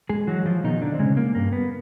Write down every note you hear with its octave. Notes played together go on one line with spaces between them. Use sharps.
G#3 G#4
E3 F#3 G#3 F#4
F3 F4
B2 D#3 D#4
D3 D4
C4
C#3 G#3 C#4
A#3
G2 A#3
B3